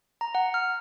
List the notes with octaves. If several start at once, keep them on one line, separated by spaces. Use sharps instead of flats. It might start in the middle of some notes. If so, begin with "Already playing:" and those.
A#5
F#5
F6